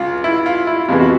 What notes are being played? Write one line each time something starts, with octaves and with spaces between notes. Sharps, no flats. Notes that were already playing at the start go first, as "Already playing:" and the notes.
Already playing: C#2 F4
E4
F4
E4
F2 C3 E3 G#3 B3 F4
F#4